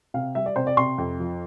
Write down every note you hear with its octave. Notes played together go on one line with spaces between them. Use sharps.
C3 F5
G3 E5
D5
C3 C5
D5
C3 C6
F2
F3